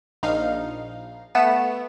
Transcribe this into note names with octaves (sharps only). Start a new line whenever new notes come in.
A#1 D#4 F5
A3 B3 E7